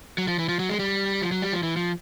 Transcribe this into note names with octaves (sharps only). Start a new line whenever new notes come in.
F#3
F3
E3
F3
F#3
G#3
G3
F3
F#3
G3
F3
E3
F3